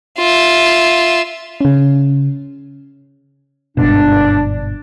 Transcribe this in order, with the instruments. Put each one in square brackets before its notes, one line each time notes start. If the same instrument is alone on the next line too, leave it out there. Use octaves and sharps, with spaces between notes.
[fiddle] F4 E5
[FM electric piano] C#3 C#4
[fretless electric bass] G1 G#2 B2 [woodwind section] D4